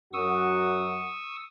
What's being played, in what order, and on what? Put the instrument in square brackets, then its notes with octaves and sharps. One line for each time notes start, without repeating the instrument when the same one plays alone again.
[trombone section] F#2 F#4 [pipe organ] C#6 D#6 E6